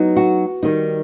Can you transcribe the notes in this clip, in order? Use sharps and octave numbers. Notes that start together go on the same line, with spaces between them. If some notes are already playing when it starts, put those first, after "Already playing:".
Already playing: F#3 B3 D#4
F#4
D#3 G3 D#4